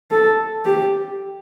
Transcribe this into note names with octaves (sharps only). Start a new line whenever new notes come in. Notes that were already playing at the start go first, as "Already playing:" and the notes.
A4
G4